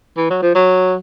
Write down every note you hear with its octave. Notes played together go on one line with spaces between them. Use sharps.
E3
F#3
F3
F#3